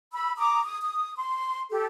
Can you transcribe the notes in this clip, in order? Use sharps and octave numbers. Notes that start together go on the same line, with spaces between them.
B5 E6
A#5 D6 D#6
D#6
D#6
C6
G4 A4